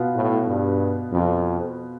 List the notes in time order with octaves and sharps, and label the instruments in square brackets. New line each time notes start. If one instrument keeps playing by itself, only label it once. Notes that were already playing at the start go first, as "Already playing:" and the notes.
Already playing: [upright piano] B2 B3 F4
[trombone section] A2
G2
F2